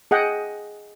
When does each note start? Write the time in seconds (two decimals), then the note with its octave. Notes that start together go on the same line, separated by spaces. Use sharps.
0.11 G#4 D#5 F#5 G5